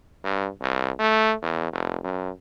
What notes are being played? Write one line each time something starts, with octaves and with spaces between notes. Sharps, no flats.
G2
C2
A3
E2
F1
F#2